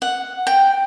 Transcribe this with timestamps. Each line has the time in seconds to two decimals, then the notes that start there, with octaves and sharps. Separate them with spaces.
0.02 F#5
0.47 G5